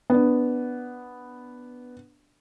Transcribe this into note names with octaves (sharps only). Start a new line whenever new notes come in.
B3 D4